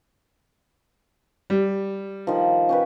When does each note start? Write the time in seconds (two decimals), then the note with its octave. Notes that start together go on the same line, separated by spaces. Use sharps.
1.50 G3
2.27 D#3 F3
2.69 C#4 G4 B4